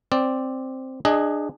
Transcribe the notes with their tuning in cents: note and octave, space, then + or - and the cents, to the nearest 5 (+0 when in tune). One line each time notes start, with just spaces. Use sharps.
C4 +0 D5 +0
D4 +25 G#4 -5 D#5 +10